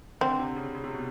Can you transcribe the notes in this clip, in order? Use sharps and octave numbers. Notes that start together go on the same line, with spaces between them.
D3 C4
C3
C#3
C#3
C3
B2